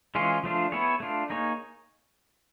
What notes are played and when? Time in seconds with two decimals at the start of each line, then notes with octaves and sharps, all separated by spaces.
0.15 E3 G#3 C#4 F4 G#4
0.43 F3 A3 D4 F4
0.72 B3 E4 G#4 C#5
1.00 A3 D4 F4
1.30 A#3 D#4 G#4 C#5